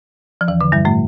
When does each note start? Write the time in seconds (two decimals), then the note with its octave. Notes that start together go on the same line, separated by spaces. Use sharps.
0.41 F3
0.48 E2 E3
0.61 D3
0.72 G2 G3
0.85 A2 A3